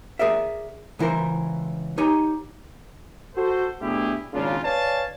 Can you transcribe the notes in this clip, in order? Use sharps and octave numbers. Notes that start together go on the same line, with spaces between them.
G#4 A#4 D5 E5
C#2 E3 E4 A#4 C5
D#4 G4 C#5 D#5 G#5 A#5
F#4 A4 C5
B2 A3 D4 E4 G4 G#4
G#1 A#2 C#3 D4 F4
B4 C#5 D5 F5 G#5 A5